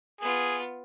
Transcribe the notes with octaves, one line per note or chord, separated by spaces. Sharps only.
B3 F4 G#4